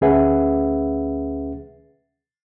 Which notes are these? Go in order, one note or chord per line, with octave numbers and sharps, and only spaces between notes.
D2 C#4 G#4 B4 E5 F#5